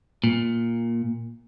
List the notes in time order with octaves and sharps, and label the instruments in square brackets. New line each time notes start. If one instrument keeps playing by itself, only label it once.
[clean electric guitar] A#2